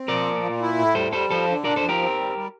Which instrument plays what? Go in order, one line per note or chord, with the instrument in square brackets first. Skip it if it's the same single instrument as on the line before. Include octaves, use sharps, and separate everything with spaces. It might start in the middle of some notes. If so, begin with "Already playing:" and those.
Already playing: [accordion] C4
[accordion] F3 [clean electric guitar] A#4 D5
[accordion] A#2
A#2
E4
A2
[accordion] G3 [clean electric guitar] A4 C5
[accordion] G3 [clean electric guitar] A4 C5
[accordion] F3 [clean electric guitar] A4 C5
[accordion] D3
[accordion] D4 [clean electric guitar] A#4 D5
[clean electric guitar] A4 C5
[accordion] F3
[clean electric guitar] G4 A#4
[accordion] C4
G3
G3